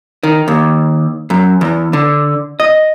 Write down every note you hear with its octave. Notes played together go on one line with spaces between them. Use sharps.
D#3
D#2
F#2
E2
D3
D#5